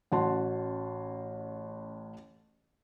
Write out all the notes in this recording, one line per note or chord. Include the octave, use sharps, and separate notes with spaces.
A1 C#4 F#4 C#5 A5 C6